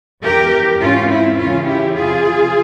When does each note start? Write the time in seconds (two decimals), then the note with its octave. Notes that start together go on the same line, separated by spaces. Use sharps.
0.23 E2 E3 G4 A#4
0.80 G#2 E3 C#4 F4
1.09 C4 E4
1.37 E2 C#3 E3 C#4 F4
1.66 E4 G4
1.94 E2 C3 F3 F4 G#4